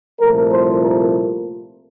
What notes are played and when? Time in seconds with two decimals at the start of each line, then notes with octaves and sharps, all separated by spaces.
0.20 C2 A#2 F3 A3 A#4
0.52 C5
0.82 A#4